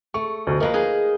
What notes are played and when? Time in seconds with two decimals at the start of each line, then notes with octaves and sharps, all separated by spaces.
0.14 A3 C#6
0.47 D2 B2
0.60 F3 A#3 A#4 B4 D#5
0.73 D#4 G#4 B4